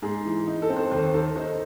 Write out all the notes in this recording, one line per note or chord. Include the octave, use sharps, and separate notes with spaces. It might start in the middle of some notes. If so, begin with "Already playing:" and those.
G#2 G#4
E3
D#4
A4
C4
C5
D#2 C5
D#3 A4
D#4 C5